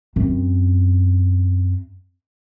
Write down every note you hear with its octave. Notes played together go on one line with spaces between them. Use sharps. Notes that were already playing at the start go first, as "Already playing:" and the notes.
F#2 C4